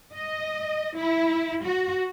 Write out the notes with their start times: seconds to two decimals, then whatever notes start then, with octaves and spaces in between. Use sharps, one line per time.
0.13 D#5
0.97 E4
1.64 F#4